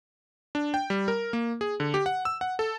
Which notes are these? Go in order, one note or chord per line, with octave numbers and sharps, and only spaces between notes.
D4
G5
G3
A#4
A#3
G#4
D3
G4
F#5
E6
F#5
A4